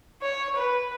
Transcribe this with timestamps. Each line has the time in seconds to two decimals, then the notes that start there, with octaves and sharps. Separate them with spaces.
0.22 C#5
0.56 B4